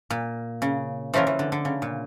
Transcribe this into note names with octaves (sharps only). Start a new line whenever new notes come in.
A#2
C#3
E3 F3 A3 C#4 F4 A#4
E3
D3
D3
C#3
A#2